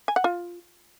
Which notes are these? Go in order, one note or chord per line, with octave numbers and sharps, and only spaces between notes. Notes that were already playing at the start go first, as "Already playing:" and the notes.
G#5
F#5
F4